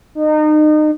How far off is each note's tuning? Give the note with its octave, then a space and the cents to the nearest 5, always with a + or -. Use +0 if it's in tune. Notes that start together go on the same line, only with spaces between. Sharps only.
D#4 -30